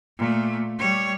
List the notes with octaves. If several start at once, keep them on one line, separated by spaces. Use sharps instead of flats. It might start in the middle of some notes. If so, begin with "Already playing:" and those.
A#2 A3
G3 C#5